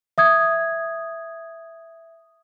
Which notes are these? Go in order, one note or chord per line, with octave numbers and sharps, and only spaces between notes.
E5 D#6 G#6